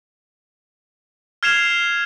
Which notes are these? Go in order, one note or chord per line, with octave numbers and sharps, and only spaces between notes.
F6 G#6 C7 E7 F7